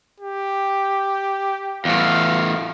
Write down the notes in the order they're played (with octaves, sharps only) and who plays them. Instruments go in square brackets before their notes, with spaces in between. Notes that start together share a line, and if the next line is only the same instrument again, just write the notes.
[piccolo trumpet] G4
[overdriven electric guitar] E2 A2 [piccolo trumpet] F5